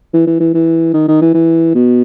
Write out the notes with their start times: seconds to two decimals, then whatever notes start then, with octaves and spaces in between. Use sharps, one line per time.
0.14 E3
0.27 E3
0.40 E3
0.54 E3
0.94 D#3
1.08 D#3
1.22 E3
1.34 E3
1.75 B2